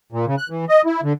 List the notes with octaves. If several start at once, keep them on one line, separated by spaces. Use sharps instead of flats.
A#2
C#3
F#6
E3
D#5
E4
D3